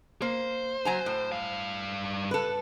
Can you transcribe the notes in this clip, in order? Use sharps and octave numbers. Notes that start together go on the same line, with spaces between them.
A#3 C5
F#3 G#5 A#5
A2
G2 F5
A4 B4